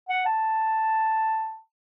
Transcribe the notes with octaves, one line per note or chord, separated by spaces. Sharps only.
F#5
A5